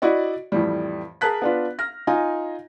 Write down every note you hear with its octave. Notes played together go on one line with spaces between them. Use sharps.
E4 F#4 D5 D#5
F2 A2 E3 G3
G#4 A#4 A5 F#6 B6
B3 D4 F4
F6 A#6
D#4 F4 G#5